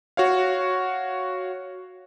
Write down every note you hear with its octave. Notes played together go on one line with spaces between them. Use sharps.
F#4 C#5 F5